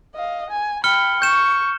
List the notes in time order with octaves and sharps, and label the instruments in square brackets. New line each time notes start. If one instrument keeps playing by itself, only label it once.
[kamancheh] D#5 F5
G#5
[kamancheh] G5 B5 [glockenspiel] F6 C#7 G7
[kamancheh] C#6 [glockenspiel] G6 E7